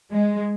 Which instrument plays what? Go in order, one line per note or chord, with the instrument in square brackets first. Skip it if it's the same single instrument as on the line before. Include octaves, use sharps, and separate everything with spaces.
[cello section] G#3